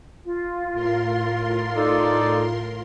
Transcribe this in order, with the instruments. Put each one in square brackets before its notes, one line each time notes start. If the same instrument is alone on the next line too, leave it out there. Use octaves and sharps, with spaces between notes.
[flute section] F4
[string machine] A2 A#4 C6
[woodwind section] D#4 A4 [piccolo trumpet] D5